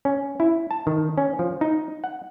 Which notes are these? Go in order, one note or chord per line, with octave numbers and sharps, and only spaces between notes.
C#4
E4
A5
D#3
C#4
F3
D#4
F#5